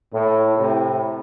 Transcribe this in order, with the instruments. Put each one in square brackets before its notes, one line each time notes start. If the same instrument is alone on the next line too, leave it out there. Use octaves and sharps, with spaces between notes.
[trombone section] A2
A2 C3